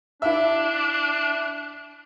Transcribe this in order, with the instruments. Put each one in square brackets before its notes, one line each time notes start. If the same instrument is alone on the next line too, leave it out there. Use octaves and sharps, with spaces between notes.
[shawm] D4 [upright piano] E4 E5